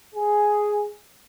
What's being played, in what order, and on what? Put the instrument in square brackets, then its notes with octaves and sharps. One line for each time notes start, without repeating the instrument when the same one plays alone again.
[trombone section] G#4